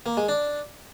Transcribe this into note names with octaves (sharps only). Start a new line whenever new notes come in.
A#3
G#3
D4